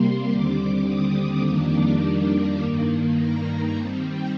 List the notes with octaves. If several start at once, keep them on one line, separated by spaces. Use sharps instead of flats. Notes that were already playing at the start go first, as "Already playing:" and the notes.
Already playing: C3 G3 A#3 C6
D#2 D3 G3 C4 D6
D#6
F2 D#3 G3 A#3 D4 D6
G2 D#3 A#3
A#5
D#3 G3 C4 A5
G5